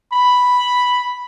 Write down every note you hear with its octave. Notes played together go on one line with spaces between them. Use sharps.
B5